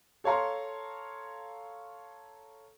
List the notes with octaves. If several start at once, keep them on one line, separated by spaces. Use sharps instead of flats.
A4 C#5 F5 A#5 C6